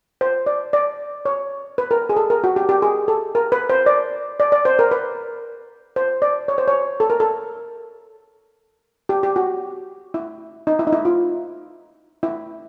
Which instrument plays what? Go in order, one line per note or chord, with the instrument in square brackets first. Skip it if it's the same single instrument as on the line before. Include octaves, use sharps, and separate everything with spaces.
[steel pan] C5
D5
D5
C#5
B4
A#4
G#4
A4
A#4
F#4
G4
G4
G#4
A4
A#4
B4
C5
D5
D5
D5
C5
A#4
B4
C5
D5
C#5
C5
C#5
A4
A#4
A4
G4
G4
F#4
E4
D#4
E4
D#4
E4
F4
E4